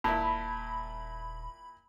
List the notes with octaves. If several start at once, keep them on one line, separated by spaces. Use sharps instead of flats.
D#1 A#2 E4 A5 B5